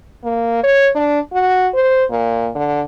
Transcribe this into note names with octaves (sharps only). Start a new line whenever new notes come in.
A#3
C#5
D4
F#4
C5
A#2
D3